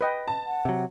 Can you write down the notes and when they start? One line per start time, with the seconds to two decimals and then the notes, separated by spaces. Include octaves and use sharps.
0.01 B4 D#5 G5
0.28 A5
0.46 F#5
0.65 C3 F#3